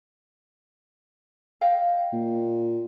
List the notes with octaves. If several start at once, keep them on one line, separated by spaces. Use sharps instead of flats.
D#5 F5 G5
A#2